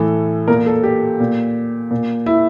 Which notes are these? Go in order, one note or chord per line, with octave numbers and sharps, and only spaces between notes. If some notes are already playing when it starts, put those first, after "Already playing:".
Already playing: A2 E3 A4
A#2 A#4
A4
G4
A#2
A#2
E4